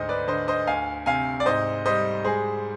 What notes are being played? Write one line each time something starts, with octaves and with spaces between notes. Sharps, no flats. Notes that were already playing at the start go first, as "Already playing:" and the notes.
Already playing: D2 G#2 C5 D#5
B4 D5
D3 C5 D#5
C5 D#5
D2 F5 G#5
C3 F5 G#5
D5
G#2 C5 D#5
G3 C5 D#5
G#3 G#4 C5